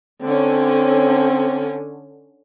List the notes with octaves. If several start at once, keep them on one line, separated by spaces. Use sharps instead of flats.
D3 C4 C#4